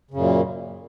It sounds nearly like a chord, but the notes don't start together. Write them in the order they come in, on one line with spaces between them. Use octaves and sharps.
C#3 F#2 A#2